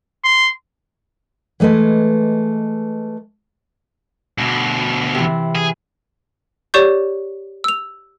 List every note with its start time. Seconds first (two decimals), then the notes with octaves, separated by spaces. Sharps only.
0.24 C6
1.60 E3 G#3 A3 B4 D#5
4.38 D2 B2
5.14 C3 E3
5.55 G#4
6.74 G4 C#5 D5 C#6 G6
7.64 E6 F7